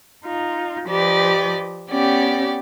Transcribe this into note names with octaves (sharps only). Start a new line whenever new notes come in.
D#4 F4
F3 G4 B4 D5 D#5
B3 C#4 G4 D5 G5